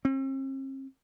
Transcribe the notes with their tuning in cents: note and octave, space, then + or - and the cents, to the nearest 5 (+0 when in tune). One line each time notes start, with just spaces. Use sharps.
C4 +45